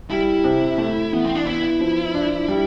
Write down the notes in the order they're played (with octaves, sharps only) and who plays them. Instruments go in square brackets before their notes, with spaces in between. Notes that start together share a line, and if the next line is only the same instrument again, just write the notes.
[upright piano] G3 [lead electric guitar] E4
[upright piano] C3
A3
[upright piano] E3 [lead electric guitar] B3
[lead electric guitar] C4
D4
[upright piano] B3 [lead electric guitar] E4
[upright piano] F3
D4
G3